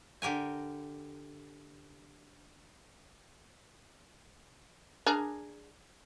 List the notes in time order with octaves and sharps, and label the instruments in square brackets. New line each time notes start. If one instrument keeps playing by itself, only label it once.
[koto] D3 G4 A#4 G#5
[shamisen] D4 G#4 A#4